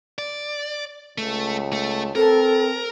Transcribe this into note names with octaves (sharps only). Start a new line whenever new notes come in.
D5
C#2 A3
A3
C4 A4 A#4